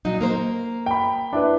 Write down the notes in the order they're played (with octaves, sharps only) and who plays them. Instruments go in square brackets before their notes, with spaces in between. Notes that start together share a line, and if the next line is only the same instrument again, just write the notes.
[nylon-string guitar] A#2 F#3 D#4
A#3 A#4 C5
[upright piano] G5 B5
D4 E4 B4